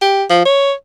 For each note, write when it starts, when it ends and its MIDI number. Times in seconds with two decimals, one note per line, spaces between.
0.02 0.23 67
0.30 0.44 53
0.45 0.72 73